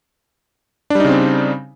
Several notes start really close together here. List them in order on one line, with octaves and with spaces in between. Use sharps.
D4 G3 D#4 C#3 C4